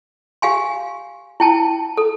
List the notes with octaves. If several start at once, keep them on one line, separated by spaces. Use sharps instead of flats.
G4 F5 G#5 C6
E4 G5 A5
A4